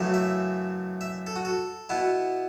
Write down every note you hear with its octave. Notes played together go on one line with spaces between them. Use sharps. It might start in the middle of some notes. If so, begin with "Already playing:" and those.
Already playing: F#2 C#3 E3 A3
E5
E5
A4
F#4
A4
B2 B3 E4